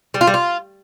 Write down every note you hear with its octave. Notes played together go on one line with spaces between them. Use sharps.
G3
F4
G3
F4